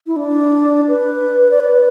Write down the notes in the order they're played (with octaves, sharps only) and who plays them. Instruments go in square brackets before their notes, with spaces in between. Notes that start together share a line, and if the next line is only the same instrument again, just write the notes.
[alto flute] E4
D4
B4
D5
B4